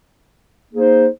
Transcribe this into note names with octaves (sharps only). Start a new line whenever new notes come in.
A#3 D#4 G#4 C5